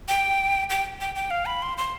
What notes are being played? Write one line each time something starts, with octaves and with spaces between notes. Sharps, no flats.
G5
G5
G5
G5
F5
B5
C6
C6